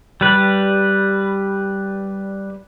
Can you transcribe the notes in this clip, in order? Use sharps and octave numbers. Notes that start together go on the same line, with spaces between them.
G3 B4